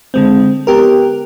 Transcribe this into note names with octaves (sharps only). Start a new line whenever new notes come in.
D3 G#3 C4
B3 G4 A#4